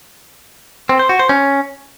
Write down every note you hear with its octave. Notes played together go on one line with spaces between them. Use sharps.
C4
C5
F#4
C5
C#4